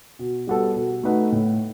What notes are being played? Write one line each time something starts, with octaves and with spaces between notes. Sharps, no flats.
B2
G3 B3 F#4 A4
B2
A3 D#4 F#4 B4
A2